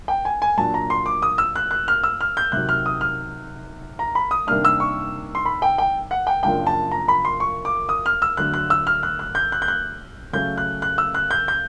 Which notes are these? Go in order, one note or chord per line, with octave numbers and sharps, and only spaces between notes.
G5
G#5
G#5
A#2 F#3 A#3 D4 A5
A#5
C6
D6
D#6
E6
F#6
F#6
F6
E6
F6
G6
C3 D#3 F#3 F#6
F6
D#6
F6
A#5
B5
D#6
C3 D#3 G3 A#3 D4 F6
E6
C#6
C6
B5
G5
G5
F#5
G5
F#2 C#3 F3 A#3 D4 G5
A5
A#5
B5
C6
C#6
D6
D#6
F6
E6
D2 D3 F#3 F#6
F#6
E6
F6
F#6
F#6
G6
F#6
G6
F#6
C#3 F#3 A3 C#4 G6
F#6
F#6
E6
F#6
G6
G6